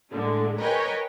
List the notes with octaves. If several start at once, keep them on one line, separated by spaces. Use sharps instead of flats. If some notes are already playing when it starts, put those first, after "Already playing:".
A2 D3 G#3
A#4 B4 C#5 D#5 G5 G#5